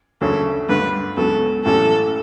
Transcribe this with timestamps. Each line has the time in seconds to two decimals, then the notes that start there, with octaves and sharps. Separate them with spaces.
0.21 D2 C#3 F#3 A4
0.69 G2 D3 A3 B4
1.17 C#2 C#3 F#3 B3 A4
1.65 A1 A2 F#3 C#4 G4 A4